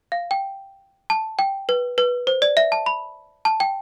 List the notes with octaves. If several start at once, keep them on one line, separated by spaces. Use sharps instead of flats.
F5
G5
A5
G5
B4
B4
C5
D5
E5
A5
B5
A5
G5